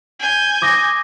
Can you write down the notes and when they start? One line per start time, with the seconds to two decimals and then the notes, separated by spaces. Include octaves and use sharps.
0.19 G#5 G6
0.62 D6 D#6 A#6